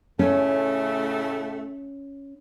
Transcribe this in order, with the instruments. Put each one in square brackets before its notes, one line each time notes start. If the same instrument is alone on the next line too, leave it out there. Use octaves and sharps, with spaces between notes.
[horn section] A2 C#3 A3 [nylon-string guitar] C#4